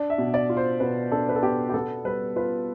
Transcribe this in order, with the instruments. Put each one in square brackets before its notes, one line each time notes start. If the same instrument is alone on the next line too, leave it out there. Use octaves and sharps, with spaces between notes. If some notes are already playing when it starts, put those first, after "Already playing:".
Already playing: [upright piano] D4 D5
E5
B2
D5
F4
C5
B2 B4
D4 A4
B4
A4
B2 G4
G4
B3 A4
G3 B4
F4 B4